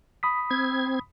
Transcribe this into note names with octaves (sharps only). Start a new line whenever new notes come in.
B5 D#6 B6
C4 G#6